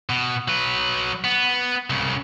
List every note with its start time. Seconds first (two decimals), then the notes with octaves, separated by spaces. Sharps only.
0.10 B2
0.48 F#3 B4
1.24 B3
1.90 C2 C#3